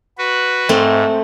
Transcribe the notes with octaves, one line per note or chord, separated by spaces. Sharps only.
F#4 B4
G#2 A3 C4